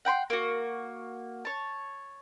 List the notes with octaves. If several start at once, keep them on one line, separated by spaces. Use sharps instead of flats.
F#5 G5 B5 C6
A#3 F#4
C#5 A5